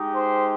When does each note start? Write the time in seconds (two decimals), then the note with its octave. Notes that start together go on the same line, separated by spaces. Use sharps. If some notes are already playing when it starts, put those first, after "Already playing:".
Already playing: G#3 D#4 G4
0.12 C5